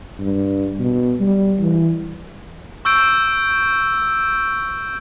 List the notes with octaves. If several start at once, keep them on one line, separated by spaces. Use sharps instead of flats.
G2
B2
G3
E3
C#6 E6 G6 D7